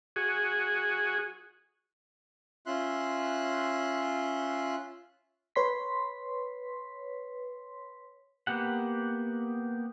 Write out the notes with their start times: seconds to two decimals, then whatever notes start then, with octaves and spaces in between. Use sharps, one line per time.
0.16 F#4 G#4
2.66 C#4 F4 E5 C6 F#6
5.56 B4 C#5 C6 B6
8.47 A#3 B3 G4 F#5